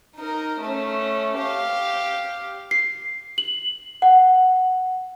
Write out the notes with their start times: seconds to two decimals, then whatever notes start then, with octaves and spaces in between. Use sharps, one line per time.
0.16 D#4 A#4
0.60 A3 C#4
1.38 G4 F5
2.71 C7
3.38 F#7
4.02 F#5